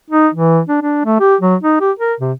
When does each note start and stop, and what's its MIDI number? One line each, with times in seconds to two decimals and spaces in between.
0.10 0.28 63
0.34 0.61 52
0.69 0.78 62
0.82 1.01 62
1.05 1.17 57
1.20 1.36 67
1.41 1.56 54
1.63 1.76 63
1.80 1.92 67
1.99 2.14 70
2.20 2.32 48